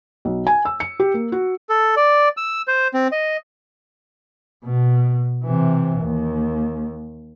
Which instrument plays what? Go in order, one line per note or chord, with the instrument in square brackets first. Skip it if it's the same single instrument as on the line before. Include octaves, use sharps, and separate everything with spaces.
[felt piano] B1
G#5
E6
C#7
G4
A#3
F#4
[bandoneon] A4
D5
E6
C5
C4
D#5
[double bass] B2
C3 E3
D#2